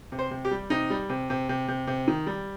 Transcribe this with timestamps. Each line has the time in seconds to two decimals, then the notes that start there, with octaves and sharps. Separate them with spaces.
0.12 C3
0.19 C5
0.31 C3
0.45 G4
0.51 G3
0.70 C3 D#4
0.90 G3
1.09 C3
1.30 C3
1.49 C3
1.68 C3
1.87 C3
2.08 D#3
2.26 G3